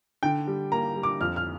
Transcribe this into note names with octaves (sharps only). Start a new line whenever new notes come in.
D3 G5
G3
A#3 A#5
G3
D6
F2 F6
F6